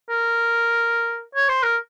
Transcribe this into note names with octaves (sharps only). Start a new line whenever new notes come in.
A#4
C#5
C5
A#4